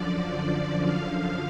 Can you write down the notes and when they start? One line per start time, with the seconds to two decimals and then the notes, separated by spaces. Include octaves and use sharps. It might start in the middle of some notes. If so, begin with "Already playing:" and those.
Already playing: F#2 D3 F3 D5
0.31 D5
0.84 F#2 D3 F3 F5